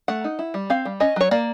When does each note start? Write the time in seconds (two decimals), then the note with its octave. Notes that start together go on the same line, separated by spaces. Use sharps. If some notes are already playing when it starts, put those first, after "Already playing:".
0.08 A3 F#5
0.24 D#4
0.39 E4
0.54 G3
0.70 C4 F5
0.85 G3
1.00 C#4 D#5
1.16 F#3 C#5
1.31 A#3 D5